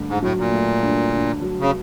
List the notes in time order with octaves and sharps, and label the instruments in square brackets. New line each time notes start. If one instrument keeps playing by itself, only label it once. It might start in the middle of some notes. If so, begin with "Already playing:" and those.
Already playing: [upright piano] G2 D3 A3
[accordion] G#2
[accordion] A2 [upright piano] F#3
[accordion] A#2
[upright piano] A3
G2
D3
F#3
[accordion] C#3